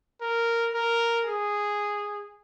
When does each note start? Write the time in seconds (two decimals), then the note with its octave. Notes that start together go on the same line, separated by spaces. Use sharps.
0.21 A#4
0.73 A#4
1.25 G#4